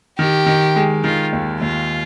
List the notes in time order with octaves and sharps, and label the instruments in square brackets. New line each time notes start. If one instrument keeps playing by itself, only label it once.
[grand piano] D#3 [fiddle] G4
[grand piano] D#3
G#3
[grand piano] D#3 [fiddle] F4
[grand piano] D#2
[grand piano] D#2 [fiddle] F4